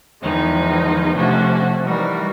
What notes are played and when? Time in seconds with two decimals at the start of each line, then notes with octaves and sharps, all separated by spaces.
0.20 E2 D#3 F3 G#3 D#4
1.14 C3 F3 A3 C#4 D4 F#4
1.82 E3 G3 D#4 F#4 A#4